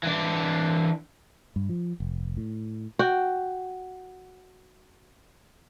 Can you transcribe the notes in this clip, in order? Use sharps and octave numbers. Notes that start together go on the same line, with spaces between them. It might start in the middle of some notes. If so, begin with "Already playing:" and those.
E3 D4
G2
F3
F1
A2
F#4 G5